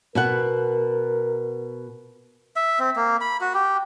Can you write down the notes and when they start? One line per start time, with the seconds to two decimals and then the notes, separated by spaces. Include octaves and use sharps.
0.15 B2 B3 A#4 F#5
2.56 E5
2.79 C4
2.96 A#3
3.21 B5
3.41 F#4
3.54 G4